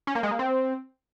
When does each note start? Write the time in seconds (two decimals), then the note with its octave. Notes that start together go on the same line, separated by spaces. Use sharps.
0.07 C#4
0.15 A#3
0.23 G#3
0.31 A#3
0.39 C4